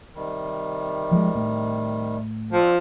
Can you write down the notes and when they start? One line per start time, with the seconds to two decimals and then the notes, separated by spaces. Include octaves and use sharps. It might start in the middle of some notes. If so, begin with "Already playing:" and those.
0.15 C3 D#3 G3
1.11 F3 G#3
1.35 A2
2.53 F3 C4 D4